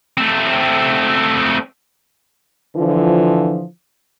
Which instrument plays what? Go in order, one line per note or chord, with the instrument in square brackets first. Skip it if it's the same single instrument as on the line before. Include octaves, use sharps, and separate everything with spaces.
[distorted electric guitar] A3 C4
[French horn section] D3 E3 F3